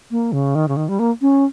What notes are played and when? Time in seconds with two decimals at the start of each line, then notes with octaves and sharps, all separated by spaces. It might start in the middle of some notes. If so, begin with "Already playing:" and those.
0.11 A#3
0.32 C#3
0.55 D#3
0.68 C#3
0.77 D#3
0.89 G3
0.99 A#3
1.21 C#4